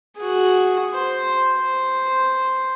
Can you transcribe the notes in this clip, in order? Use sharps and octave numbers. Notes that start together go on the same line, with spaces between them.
F#4 G#4
C5
C5